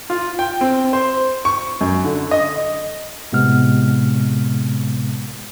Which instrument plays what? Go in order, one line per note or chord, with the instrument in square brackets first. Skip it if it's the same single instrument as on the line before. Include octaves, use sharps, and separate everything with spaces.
[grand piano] F4
G5
C4
C5
C#6
F#2
D3
D#5
[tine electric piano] A2 C3 G#3 B3 F6